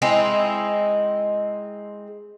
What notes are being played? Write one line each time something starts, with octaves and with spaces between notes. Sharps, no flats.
G#3 C4 D#4 E4